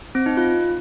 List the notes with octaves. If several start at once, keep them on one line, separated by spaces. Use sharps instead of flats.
C4
D#4
F4